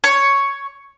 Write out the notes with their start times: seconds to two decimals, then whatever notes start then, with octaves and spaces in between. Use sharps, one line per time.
0.04 C#5